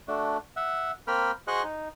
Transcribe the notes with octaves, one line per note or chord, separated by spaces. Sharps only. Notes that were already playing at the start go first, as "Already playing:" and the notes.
A3 D4 F#4
E5 F#5
A#3 C4 A#4 G5 B5 F6
F#4 G#4 C5 D#5 C#6 F#6
D#4